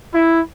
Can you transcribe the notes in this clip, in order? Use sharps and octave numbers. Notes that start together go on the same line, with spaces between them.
E4